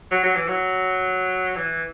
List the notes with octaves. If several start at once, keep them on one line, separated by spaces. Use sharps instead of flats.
F#3
F#3
E3
F#3
E3